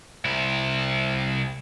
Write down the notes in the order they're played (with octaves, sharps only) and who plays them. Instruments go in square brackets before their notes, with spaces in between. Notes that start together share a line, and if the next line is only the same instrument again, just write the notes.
[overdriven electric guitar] C2 E4